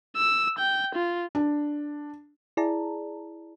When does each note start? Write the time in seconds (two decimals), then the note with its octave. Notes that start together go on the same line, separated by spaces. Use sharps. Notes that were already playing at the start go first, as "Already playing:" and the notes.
0.17 E6
0.58 G5
0.95 F4
1.35 D4
2.57 E4 G#4 D5 A5 A#5